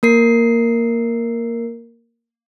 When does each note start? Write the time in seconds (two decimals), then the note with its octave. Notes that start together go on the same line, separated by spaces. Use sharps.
0.03 A#3 A#4 C7